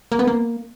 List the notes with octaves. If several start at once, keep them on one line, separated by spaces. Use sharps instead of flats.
A#3
B3
A#3